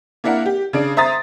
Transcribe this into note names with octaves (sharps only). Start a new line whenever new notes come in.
A#3 D4 E4 A#4 F#5
G4
C#3 D4 D7
C5 E5 A#5 D#6 A6